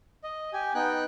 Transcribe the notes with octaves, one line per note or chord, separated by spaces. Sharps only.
D#5
G4 G#5
B3 D#4 G5 F#6